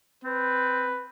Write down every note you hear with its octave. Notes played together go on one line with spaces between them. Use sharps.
C4 B4